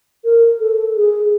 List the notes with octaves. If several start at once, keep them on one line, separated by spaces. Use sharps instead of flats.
A#4
A4
G#4